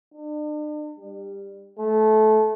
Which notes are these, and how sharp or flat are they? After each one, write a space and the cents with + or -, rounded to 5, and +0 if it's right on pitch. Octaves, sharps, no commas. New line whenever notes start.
D4 +40
G3 +15
A3 -20